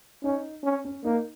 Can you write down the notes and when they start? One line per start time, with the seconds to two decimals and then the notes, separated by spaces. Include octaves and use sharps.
0.24 C#4 D#4
0.64 C#4
0.85 C#4
1.04 A#3 D#4